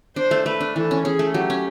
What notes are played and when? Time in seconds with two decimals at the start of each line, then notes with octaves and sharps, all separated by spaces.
0.16 D4 C5
0.31 A3
0.46 A3 B4
0.61 D4
0.76 E3 A4
0.91 C#4
1.05 C#4 G#4
1.19 A3
1.34 F#3 G4
1.50 C#4